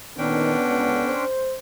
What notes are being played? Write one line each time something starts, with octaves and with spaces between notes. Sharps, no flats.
A#2 D3 D#3 B3 C#4 D4 G5
C#2
C5